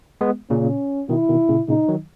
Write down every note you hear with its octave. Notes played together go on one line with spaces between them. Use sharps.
G#3 B3
A#2 C#3 C#4
B2 D#3 E4
B2 D#3
A#2 C#3
A#2 C#3 D#4
D#3 F#3